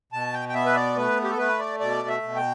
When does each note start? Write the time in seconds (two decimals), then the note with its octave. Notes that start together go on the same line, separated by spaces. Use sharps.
0.12 B2 A5
0.33 G5
0.49 G5
0.54 B3 E5
0.66 B4
0.75 D5
0.96 A3 B4
1.24 G4
1.31 A4
1.38 A3 B4
1.59 D5
1.80 B2 D5
2.08 E5
2.22 B2
2.36 G5